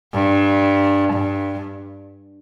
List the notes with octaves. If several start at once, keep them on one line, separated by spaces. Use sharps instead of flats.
G2
G2